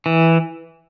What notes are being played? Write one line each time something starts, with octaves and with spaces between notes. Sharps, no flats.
E3